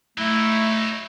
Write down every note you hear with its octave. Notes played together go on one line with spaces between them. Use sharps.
F#3 A3 D#4 E4